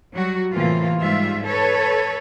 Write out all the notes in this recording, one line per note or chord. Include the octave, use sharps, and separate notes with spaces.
F#3 G3 F#4
A2 C3 E3 A#3 F4
G#2 G3 F4 E5
A4 B4 C#5